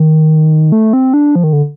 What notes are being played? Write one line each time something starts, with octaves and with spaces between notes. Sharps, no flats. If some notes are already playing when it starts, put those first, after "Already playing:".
Already playing: D#3
A3
C4
D4
F3
D#3
D3